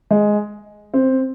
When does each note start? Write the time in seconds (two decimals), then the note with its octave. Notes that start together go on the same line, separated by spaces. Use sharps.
0.11 G#3
0.94 C4